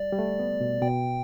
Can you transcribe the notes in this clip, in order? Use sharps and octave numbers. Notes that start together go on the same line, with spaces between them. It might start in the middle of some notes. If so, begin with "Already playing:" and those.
Already playing: G3 D5
G3
A3
B3
B2
B2 G5